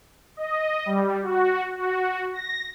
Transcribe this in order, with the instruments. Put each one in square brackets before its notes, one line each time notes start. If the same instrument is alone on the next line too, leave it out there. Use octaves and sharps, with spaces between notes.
[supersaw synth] D#5
G3
F#4
F#4
A#6